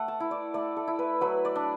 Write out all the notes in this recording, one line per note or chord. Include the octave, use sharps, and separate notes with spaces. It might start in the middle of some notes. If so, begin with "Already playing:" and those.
Already playing: A3 F#5
A5
E4
D5
A3 D5
A4
E4
B4
F#3 B4
D5
D4